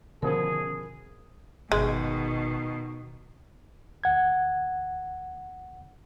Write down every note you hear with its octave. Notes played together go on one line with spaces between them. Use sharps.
B2 D3 D#3 F3 C#4 G#4 A#4
G1 B2 D#3 G#3
D2 F#5 G#6